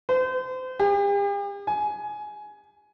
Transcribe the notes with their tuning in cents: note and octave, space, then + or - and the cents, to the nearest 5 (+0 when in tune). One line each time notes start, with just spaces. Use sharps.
C5 -35
G4 +45
G#5 +15